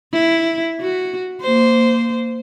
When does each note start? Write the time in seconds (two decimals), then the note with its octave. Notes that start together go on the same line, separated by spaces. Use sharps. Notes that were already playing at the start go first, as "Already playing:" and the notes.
0.13 E4
0.81 F#4
1.42 A#3 C5